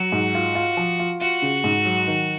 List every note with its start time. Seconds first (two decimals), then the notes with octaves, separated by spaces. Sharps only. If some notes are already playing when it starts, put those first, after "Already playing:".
Already playing: F#3 F#4
0.12 G#2
0.35 F4
0.55 F4
0.77 F3
0.99 F4
1.20 F4 F#4
1.42 C#3
1.64 G#2
1.85 F#3
2.08 D#3